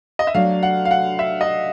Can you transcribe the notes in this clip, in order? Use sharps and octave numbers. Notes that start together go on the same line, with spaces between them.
D#5
E5
F#3 A3 D4 F5
F#5
F5
F#5
E5
D#5